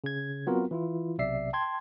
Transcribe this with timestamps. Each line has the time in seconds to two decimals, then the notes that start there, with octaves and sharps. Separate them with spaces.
0.04 C#3 G#6
0.46 F#3 B3 C4 F4 F#4 A#4
0.71 E3 E4 F4
1.18 B1 C3 D5 E5 C7
1.53 G5 A5 C6 G#6